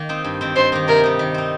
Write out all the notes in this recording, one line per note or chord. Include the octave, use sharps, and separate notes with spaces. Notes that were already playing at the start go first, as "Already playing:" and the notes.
Already playing: D#3 A#3
C4 D#4
G2
D#3 C4
G2 C5
D#3 A#3 D#4
C3 A#4
G3 D#4
D#3
C4 D#4